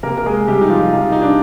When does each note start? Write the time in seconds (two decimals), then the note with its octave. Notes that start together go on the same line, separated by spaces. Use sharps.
0.03 C3 A#3 A#4
0.18 A#4
0.26 G#3 G#4
0.48 C3 G3 G4
0.61 D#4
0.70 F3 F4
0.82 F4
0.93 C3 D#4
1.12 D#4
1.22 D4